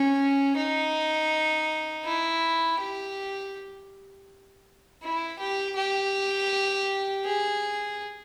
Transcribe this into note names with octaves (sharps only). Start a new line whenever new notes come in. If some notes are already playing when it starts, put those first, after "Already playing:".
Already playing: C#4
D#4
E4
G4
E4
G4
G4
G#4